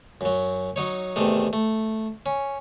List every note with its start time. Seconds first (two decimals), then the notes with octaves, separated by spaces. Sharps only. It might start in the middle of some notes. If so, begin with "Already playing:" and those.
0.21 F#2 F#3
0.76 F#3 D#4 C#5
1.16 E2 C3 D#3 A3
1.53 A3
2.26 C#4